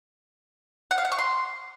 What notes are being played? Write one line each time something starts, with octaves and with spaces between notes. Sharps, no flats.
F#5
F5
F#5
C#6
C6